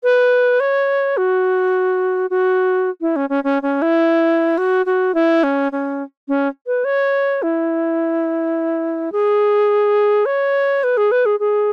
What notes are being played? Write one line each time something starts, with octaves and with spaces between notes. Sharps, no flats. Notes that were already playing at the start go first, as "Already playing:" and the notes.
B4
C#5
F#4
F#4
E4
C#4
C#4
C#4
C#4
E4
F#4
F#4
E4
C#4
C#4
C#4
B4
C#5
E4
G#4
C#5
B4
G#4
B4
G#4
G#4